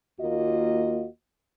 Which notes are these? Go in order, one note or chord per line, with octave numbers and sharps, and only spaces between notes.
D#2 A#3 F4 F#4 D#5